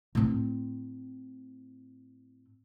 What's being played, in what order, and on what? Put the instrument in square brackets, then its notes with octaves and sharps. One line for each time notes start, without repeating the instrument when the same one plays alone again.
[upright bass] A2 C4